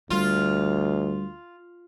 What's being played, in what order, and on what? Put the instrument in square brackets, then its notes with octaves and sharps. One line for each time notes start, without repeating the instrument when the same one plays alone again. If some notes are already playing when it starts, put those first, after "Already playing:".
[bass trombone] D2 [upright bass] G3 [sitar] F4